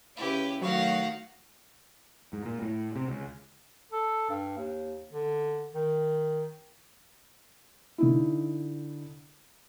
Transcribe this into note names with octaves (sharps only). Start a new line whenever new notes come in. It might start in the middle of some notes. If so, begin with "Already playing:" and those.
C#3 C#4 E4 G4 B4
D#3 F#3 A3 F#4 C#5 F5 F#5 C#6
G#2
A#2
A2
C3
C#2
A4
G2
D#2
D3
D#3
D3 D#4 E4